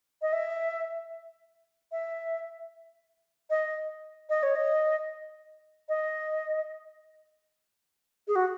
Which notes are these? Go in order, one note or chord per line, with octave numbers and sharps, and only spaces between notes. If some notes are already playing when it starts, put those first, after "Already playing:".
D#5
E5
E5
D#5
D#5
C#5
D#5
D#5
G#4
F#4